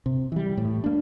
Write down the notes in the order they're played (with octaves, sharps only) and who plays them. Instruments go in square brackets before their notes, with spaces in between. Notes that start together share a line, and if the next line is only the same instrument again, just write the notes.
[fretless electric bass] C3
E3 G3
A2
A#3 D4